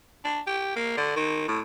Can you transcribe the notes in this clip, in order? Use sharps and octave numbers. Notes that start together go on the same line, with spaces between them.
D4
G4
A#3
D3
D#3
A2